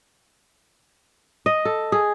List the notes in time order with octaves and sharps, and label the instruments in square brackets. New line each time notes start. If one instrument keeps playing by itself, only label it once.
[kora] D#5
A4
G#4